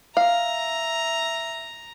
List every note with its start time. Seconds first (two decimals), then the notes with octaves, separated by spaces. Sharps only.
0.17 E5 F5 A#5